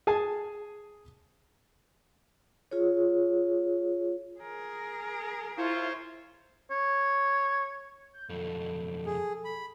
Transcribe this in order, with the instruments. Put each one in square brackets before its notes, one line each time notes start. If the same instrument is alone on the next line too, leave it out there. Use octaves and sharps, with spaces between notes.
[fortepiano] G#4 G#5 A5
[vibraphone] F4 G#4 C#5
[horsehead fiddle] G#4 A#4
[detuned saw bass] E4 [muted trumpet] F4 [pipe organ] C5 C#5
[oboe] C#5
[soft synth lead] G6
[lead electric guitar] B1 F2 [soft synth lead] A4
[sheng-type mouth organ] G#4
B5